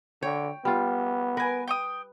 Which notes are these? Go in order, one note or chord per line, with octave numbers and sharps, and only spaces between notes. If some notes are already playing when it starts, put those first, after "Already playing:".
D3 C#5 G5
G3 B3 F4
A#4 B4 G#5
G5 C#6 D#6